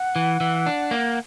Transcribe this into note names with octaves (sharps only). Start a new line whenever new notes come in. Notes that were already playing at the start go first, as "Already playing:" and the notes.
Already playing: F#5
E3
E3
D4
A#3